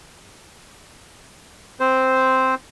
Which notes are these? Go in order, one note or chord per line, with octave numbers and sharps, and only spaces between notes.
C4 C5